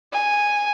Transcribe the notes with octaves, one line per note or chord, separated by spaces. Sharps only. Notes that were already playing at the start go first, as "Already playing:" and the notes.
G#5